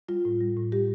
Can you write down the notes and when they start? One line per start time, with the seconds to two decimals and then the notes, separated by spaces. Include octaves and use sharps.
0.08 G3 F4
0.25 A2
0.41 G3
0.57 A2
0.72 G3 G4